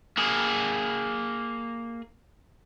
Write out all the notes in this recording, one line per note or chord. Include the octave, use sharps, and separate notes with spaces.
A#3 G#4